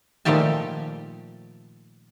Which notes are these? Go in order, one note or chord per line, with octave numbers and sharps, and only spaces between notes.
A#2 D#3 F3 A3 G4 A5